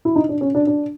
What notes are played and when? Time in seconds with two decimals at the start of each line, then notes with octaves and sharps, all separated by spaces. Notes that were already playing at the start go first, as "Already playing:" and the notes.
0.05 E4
0.16 D#4
0.29 D4
0.41 C#4
0.55 D4
0.67 D4